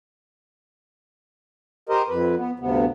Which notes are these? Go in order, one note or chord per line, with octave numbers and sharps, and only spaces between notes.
G4 A#4 C5 D#5
F2 B4
B3
D2 G2 C3 B3